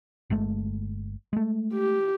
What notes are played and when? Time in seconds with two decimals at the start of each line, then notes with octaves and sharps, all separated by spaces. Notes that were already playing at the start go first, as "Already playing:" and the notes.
0.30 G1 G#3 A3
1.33 G#3 A3
1.74 G4